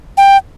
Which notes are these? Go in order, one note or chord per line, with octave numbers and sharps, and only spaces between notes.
G5